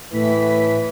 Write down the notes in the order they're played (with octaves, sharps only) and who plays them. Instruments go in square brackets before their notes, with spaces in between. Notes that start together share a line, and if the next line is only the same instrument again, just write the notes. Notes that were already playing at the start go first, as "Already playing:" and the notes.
[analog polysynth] A2 B5 B6 [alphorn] E3